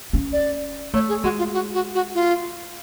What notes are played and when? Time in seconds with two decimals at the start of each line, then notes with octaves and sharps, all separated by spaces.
0.13 C#4
0.33 D5
0.94 A3 C#5
1.08 G#4
1.24 G#3 F#4
1.39 F4
1.53 F#4
1.74 F#4
1.95 F#4
2.15 F4